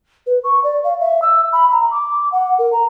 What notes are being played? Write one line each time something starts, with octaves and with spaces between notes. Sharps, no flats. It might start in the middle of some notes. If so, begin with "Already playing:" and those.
B4
C#6
D5
F5
E5
E6
B5
A#5
D6
F#5
A#4
A#5